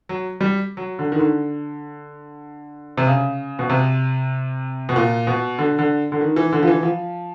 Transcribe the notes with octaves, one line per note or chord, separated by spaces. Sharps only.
F#3
G3
F#3
D3
D#3
D3
C3
C#3
B2
C3
B2
A#2
B2
D3
D3
D3
D#3
E3
D3
F3
E3
F3